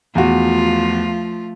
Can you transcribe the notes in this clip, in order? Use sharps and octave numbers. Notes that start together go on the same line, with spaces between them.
E2 F3 A3 F4 F#4